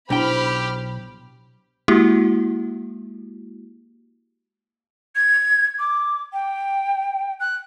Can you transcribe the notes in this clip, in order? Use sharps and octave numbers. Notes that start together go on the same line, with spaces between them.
B1 D4 E4 G4 C5 G5 B5 F6
G#3 A#3 E4 F#4 G4
G#6
D6
G5
F#6